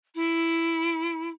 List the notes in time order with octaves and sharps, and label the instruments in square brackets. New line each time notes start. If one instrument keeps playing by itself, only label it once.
[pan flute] E4